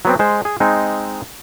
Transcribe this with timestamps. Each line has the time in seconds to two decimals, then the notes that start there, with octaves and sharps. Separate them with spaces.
0.05 F#3 B3 C4
0.19 G#3 C5
0.45 G#4
0.60 G#3 C4 D#4